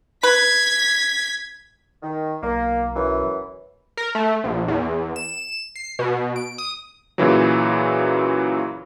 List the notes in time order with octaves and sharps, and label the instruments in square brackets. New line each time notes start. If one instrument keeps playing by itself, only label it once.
[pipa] B4 [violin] G#6 B6
[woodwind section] D#3
[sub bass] B1 [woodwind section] A#3
[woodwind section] F#2 E3
[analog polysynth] A#4
A3
A#1
E2
E7
C7
B2
D7
D#6
[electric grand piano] A#2 C#3 E3 F#3